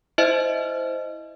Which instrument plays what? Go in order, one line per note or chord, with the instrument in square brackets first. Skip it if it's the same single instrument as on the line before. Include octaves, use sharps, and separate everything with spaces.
[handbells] E4 C5 D#5 E5